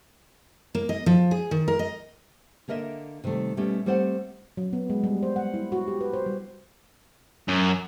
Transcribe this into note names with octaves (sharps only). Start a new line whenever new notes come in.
A#3
D#5
F3
G#4
D#3
A#4
D#5
D3 A#3 A#4 D#5 E5
C3 D#3 G3 A3
B2 G3 A3 B3 C#4 G4
G3 A3 C4 C5 D#5 F#5
F#3
B3
G#3
G3
C5
F#5
E4
F#4
G4
B4
C5
G3
F#2